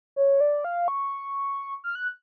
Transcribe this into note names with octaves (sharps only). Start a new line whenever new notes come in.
C#5
D5
F5
C#6
F6
F#6